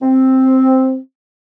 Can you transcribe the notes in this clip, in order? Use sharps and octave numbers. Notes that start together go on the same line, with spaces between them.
C4